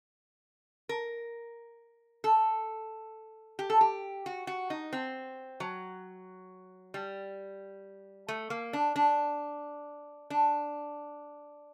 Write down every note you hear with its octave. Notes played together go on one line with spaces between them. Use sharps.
A#4
A4
G4
A4
G4
F#4
F#4
D#4
C4
F#3
G3
A3
A#3
D4
D4
D4